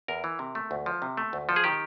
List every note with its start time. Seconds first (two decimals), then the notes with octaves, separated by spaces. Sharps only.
0.08 E2 A#4
0.24 E3
0.39 C3
0.55 A3
0.71 D2
0.86 F3
1.02 C3
1.17 A3
1.33 D2
1.49 F3 A4
1.56 G#4
1.64 D#3 G4